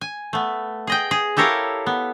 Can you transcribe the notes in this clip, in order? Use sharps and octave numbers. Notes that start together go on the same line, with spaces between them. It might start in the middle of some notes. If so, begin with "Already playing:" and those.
G#5
A3 B3
G#4 D#5 G5
G#4
E4 G4 A4 A#4 C#5 F5
B3